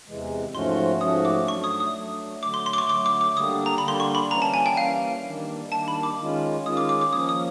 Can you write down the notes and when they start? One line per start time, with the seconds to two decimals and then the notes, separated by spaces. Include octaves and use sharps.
0.08 E2 C3 E3 G#3
0.54 G#2 F3 A3 C#4 F#4 C6
1.01 G#2 F3 A3 C#4 F#4 D#6
1.25 D6
1.48 F#3 A3 D4 C#6
1.64 D#6
1.80 D#6
1.96 F#3 A3 D4
2.43 D3 F#3 A3 D6
2.54 C6
2.66 C6
2.73 D6
2.78 C#6
2.90 D3 F#3 A3 D6
3.06 D6
3.21 D6
3.37 D3 G3 A#3 D4 G4 D#6
3.66 A#5
3.78 B5
3.83 D3 G3 A#3 D4 G4 C6
4.00 C#6
4.15 B5
4.31 E3 G3 A#3 C#4 A#5
4.42 A5
4.54 G#5
4.66 G5
4.77 E3 G3 A#3 C#4 F5
5.24 D#3 G3 A#3 D4
5.72 D#3 G3 A#3 D4 A5
5.88 B5
6.03 D6
6.19 D#3 G#3 C#4 F4
6.66 D#3 G#3 C#4 F4 D#6
6.77 D6
6.89 D6
7.01 D6
7.13 F3 A#3 C#4 D#6
7.29 D#6